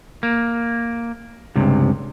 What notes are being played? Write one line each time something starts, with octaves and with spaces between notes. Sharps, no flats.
A#3
C#2 G2 C3